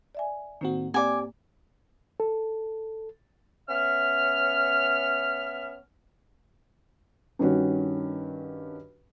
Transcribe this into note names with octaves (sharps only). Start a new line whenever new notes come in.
D5 E5 G#5
A2 D#3 A#3 C4 F#4
A#3 C4 G4 D5 G#5 D6
A4
B3 C#4 E5 F6
G2 D#3 C#4 F#4